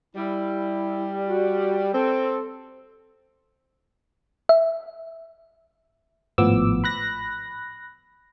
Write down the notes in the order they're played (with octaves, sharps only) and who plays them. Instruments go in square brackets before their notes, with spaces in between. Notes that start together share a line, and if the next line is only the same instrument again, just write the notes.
[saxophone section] G3 [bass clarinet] E4
[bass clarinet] F#4
[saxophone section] C4 [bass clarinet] A4
[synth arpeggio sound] E5
[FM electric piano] G#1 A2 F3 B3 D6 E6
B5 F#6 A#6